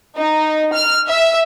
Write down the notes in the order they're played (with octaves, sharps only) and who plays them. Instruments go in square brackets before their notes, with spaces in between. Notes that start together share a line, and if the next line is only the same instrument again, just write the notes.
[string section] D#4
F6
E5